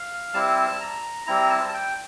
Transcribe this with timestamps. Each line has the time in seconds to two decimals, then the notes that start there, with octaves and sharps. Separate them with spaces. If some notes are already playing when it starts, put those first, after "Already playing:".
Already playing: F5
0.34 G3 C4 E4 A5
0.80 A#5
1.26 G3 C4 E4 A#5
1.50 A5
1.69 A5
1.73 G5